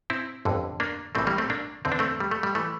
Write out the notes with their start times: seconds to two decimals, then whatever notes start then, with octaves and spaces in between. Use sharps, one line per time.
0.10 C4 E4
0.45 G1 F2 D3
0.80 A#3 D4
1.15 A#1 A2 E3 A3 C4
1.27 G3 A#3
1.38 A3 C4
1.50 A#3 D4
1.85 E2 D3 C4
1.92 D4
1.99 A3 C4
2.20 G3
2.31 A3
2.43 G3
2.55 E3 A3